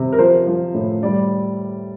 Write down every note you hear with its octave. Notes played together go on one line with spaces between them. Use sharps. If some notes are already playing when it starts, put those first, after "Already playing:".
Already playing: C3
A#4
F3 C5
F3
A2
G3 D5